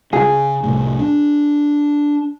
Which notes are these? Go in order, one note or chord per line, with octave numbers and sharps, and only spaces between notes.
C#3 G#4
C2 A2
D4